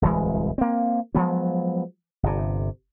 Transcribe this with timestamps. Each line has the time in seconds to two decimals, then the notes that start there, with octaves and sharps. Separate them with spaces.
0.02 D1 C2 E3 G#3
0.58 A#3 C4
1.15 F3 F#3 G#3 B3
2.23 G1 C3